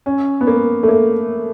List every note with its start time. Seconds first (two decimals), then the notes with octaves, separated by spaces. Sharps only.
0.06 C#4
0.41 B3
0.47 A#3
0.83 A3
0.88 A#3